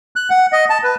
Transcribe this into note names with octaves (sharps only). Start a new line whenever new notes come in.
F#6
F#5
D#5
A5
B4